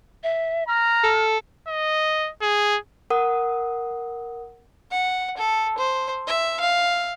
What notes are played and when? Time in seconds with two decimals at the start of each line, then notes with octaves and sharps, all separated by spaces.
0.24 E5
0.68 A#5 F6
1.04 A4
1.68 D#5
2.42 G#4
3.10 A#4 F#5 D#6
4.91 F#5
5.37 A4
5.78 C5
6.27 E5
6.60 F5